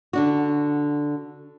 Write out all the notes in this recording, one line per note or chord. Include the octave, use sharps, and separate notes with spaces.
D3 D4 F#4